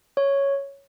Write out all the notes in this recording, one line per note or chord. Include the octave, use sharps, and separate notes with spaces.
C#5